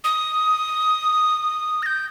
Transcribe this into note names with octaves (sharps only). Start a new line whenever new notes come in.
D#6
A#6
G6